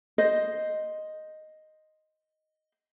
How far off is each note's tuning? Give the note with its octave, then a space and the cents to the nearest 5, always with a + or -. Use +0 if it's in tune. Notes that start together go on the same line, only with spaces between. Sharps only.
C5 +0 D#5 +0